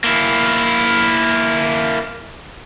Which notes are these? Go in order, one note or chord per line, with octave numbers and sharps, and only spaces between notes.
A#3 E4